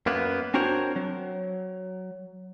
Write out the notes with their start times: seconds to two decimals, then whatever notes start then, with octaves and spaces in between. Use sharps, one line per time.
0.06 F#2 A#3 B3
0.54 C4 D4 F#4 A#4 C5 C#5
0.96 F#3